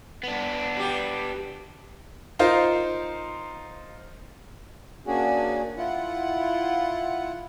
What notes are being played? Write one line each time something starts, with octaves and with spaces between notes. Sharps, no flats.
B3 D4
G3 G4
D#4 F4 A#4 C5
A#3 C#4 D4 F#4 G#4
E4 F4 F#5